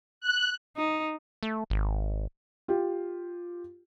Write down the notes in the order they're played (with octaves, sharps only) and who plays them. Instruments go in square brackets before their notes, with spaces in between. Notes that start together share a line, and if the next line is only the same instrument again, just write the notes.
[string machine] F#6
[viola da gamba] D#4
[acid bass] A3
G#1
[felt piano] F4 G4